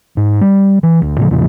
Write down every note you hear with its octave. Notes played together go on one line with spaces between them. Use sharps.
G#2
G3
E3
D2
A2 C#3 F3
E2 A2 C#3 F3